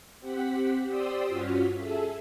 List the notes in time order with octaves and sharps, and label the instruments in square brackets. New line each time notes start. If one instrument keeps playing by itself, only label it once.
[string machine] C4 G4 F#5 B6
G4 C5 D5 C6 D#6 E6
G2 C#4 F4 F#4 F6 B6
G#4 A4 E5